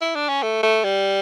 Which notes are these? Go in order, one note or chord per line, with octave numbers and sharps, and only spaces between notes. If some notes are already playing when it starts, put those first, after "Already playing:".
E4
D4
C#4
A3
A3
G3